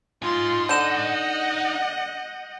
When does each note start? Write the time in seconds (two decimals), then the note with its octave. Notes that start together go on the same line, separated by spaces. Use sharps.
0.22 D#4 F4 G#5 C6
0.69 D3 D#5 F#5 G6 E7